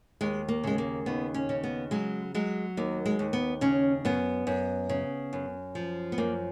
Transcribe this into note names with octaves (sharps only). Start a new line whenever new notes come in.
D#2 G#3
A#3
C#3 G#3
A#3
D#2 B3
C#4
C#3
B3
F#3 G#3
F#3 G#3
D#2 A#3
G#3
D#2
B3
C#3 C#4
F#2 B3
F#2
C#3
F#2
F3
B3
F#2 A#3